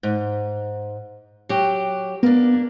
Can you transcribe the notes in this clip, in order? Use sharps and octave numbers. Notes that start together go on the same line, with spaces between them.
G#2
F#3 G4
A#3 B3 D4